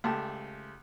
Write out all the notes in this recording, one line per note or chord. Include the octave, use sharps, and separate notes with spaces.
C#2 A3 G4 A5